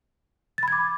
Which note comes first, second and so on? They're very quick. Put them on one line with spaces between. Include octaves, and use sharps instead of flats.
A6 B5 G#6 D6